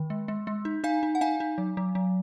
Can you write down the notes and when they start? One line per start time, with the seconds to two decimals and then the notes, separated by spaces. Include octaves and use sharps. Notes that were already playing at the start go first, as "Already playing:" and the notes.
Already playing: D#3
0.10 G#3
0.28 G#3
0.47 G#3
0.65 D#4
0.84 D#4 F5 G#5
1.03 D#4
1.15 F#5
1.21 D#4 F5 G#5
1.40 D#4
1.58 F#3
1.77 F#3
1.95 F#3